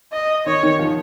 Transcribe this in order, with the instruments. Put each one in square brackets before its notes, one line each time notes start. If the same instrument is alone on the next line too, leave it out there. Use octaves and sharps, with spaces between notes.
[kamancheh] D#5
[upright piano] D#3 [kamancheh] C#5
[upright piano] D#3
F3